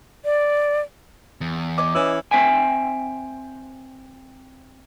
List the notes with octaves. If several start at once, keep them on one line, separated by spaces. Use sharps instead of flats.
D5
E2
C#5 D#5 D6
E3 C#4 E4
C4 C5 E5 G5 G#5